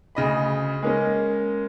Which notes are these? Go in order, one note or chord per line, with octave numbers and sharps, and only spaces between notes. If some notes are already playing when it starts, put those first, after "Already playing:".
D2 C#3 D#5 B5
G#3 A#3 C#4